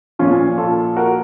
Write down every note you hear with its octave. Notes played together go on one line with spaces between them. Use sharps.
A#2 F3 C#4 F4
F4 A4
F#4 A#4